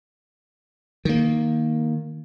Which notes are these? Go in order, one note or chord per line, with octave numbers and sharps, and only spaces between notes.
D#3 A#3